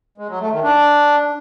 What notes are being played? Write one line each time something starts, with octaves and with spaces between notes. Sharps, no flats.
G#3
F#3
A3
D#3
D4